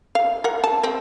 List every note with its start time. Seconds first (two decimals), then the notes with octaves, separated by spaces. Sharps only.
0.15 F5
0.44 A#4 F#5
0.64 A5
0.83 C4 D#5